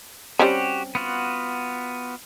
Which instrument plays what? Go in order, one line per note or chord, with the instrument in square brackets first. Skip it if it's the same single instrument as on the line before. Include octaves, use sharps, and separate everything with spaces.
[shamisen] G3 C4 C#4 [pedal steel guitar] F#4 G4
[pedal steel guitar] B3 F4 F#4